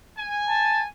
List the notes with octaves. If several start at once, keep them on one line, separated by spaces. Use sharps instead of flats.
G#5
A5